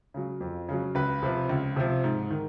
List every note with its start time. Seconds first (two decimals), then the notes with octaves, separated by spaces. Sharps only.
0.14 C#3 F#3
0.41 F2
0.69 C#3 F#3
0.95 C#2 B4
1.23 C3 F3
1.49 C#2
1.76 C3 F3
2.04 G#2
2.31 D#3